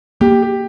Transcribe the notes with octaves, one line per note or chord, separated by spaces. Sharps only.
A#3 G4
G4